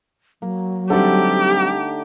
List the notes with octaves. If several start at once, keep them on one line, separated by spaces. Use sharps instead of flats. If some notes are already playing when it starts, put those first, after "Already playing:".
F#3 A#3
D3 G3 A3 C4 D#4 G4 A4